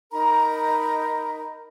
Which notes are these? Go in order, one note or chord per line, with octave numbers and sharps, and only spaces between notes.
D#4 A#4 A#5 B5